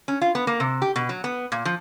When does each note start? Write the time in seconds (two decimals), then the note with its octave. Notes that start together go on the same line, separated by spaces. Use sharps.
0.08 C#4
0.22 F4
0.35 B3
0.47 A#3
0.60 C3
0.82 G4
0.96 B2
1.09 F#3
1.24 B3
1.52 A#2
1.65 F3